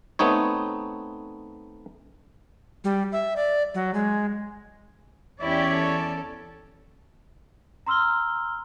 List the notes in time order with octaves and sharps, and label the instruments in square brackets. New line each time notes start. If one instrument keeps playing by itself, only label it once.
[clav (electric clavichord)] A3 B3 C4 D#4 C#5
[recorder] G3
E5
D5
F#3
G#3
[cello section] E2 C#4 D5 [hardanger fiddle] E4 G4 [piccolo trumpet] C#5
[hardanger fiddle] A4
[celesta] A#5 C6 E6 F6 G7